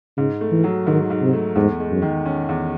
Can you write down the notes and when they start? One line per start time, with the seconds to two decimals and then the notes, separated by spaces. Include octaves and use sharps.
0.17 G#2 C#3
0.41 A3
0.52 E3
0.64 F#3
0.87 G#2 D#3
1.10 G#2
1.22 C3
1.33 A3
1.56 E2 G#2
1.80 G#3
1.91 F#2
2.02 D#3
2.26 C#4
2.49 E2